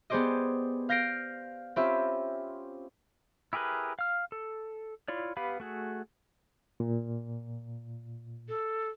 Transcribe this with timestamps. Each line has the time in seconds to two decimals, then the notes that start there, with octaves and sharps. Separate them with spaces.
0.10 B3 G4 G#4 C5 D5 D#5
0.89 F5 G6 A#6 C7 D7
1.76 C4 C#4 F4 G4 E5 B5
3.53 E4 G4 G#4 A#4 B4
3.99 F5 F6
4.32 A4
5.08 E4 F4 C#5 D5
5.37 B3 G4 B4 F5 B5
5.60 A3 F#4 G#4
6.80 A#2
8.49 A4